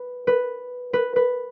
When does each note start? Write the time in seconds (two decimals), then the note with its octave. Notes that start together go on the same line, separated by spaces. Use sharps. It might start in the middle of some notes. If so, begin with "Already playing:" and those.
Already playing: B4
0.27 B4
0.93 B4
1.16 B4